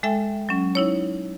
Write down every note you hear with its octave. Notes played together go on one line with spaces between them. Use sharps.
G#3 A4 E5 G5
F#3 C#4
D#4 E4 C#5